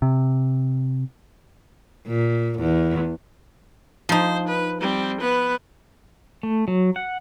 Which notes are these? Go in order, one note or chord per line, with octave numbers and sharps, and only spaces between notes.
C3
A#2
E2
F3 D#4 C5
B4
G3 C4
B3 B4
A3
F#3
F#5